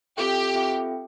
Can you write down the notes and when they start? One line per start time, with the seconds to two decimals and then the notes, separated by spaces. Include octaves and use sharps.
0.16 C4 F4 G4 A4 E5 G5
0.55 C4 F4 A4 E5 G5